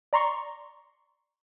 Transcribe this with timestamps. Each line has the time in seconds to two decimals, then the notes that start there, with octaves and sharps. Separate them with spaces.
0.13 D5 A#5 C6 C#6